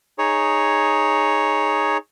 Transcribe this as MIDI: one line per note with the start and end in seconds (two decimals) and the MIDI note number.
0.18 1.97 63
0.18 1.97 68
0.18 1.97 73